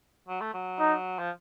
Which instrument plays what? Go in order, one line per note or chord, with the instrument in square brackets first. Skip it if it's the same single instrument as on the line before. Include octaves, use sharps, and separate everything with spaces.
[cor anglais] F#3
A3
F#3
[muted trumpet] D#4
[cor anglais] F3